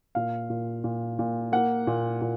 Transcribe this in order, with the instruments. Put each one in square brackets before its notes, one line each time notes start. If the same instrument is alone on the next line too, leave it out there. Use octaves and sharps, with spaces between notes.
[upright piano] A#2 F5
A#2
A#2
A#2
A#3 F#5
A#2
A#2